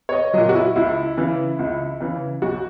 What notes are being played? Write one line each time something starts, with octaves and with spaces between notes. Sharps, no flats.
C#5
D#5
A#2 F#3 D#5
F#4
E4
C#2 E4
C#3 E3
C#2
C#3 E3
B1 F#4